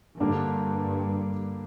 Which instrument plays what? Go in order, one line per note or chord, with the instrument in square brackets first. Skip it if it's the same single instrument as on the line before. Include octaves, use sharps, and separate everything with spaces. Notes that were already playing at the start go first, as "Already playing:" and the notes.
[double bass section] G2 [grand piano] D3 G3 A#3 D4